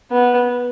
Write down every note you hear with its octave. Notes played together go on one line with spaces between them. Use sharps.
B3